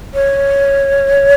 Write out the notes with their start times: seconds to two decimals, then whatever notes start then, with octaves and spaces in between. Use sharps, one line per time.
0.14 C#5